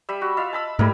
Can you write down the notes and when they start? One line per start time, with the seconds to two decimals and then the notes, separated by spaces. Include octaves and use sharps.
0.09 G3 E5
0.22 F#4
0.37 F4 D#5 E5
0.53 A5 B5 E6
0.79 G#2 G3 A3 E4 A#4